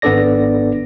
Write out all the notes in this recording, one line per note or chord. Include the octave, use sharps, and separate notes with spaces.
G#1 B3 D4 A4 D5 A#6